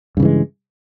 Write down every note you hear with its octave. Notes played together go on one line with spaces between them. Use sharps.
G2 C#3 E3 G#3